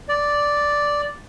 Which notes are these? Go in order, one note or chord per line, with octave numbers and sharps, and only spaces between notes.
D5